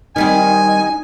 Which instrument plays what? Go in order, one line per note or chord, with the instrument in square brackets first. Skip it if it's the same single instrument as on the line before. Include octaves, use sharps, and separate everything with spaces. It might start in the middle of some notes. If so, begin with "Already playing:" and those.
[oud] D#3 G3 C4 [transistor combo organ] D#4 [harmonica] G#5